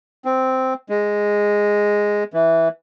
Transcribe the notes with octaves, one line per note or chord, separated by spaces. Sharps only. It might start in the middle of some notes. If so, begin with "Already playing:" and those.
C4
G#3
E3